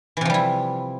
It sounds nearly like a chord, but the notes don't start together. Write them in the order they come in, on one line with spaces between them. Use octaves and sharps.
E3 C3 F3 G3 E4